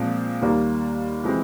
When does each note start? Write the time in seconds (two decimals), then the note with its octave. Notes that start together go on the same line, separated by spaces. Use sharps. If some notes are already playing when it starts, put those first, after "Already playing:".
Already playing: A#2 F3 G#3 C4
0.41 D#2 D#3 G3 A#3
1.24 E3 G#3 C4